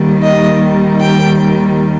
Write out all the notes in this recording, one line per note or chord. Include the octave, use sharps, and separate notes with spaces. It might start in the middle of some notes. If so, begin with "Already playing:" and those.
Already playing: D#2 D#3 G3
D#5
G5